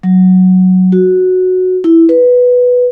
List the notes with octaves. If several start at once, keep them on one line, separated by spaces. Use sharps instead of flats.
F#3
F#4
E4
B4